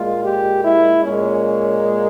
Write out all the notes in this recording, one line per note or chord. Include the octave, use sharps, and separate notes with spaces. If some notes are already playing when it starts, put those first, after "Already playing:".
Already playing: A#2 G#3 F4
G4
E4
A#2 G#3 C#4